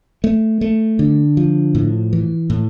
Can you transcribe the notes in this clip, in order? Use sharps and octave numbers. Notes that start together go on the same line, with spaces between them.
A3
A3
D3
F3
A2
E3
A2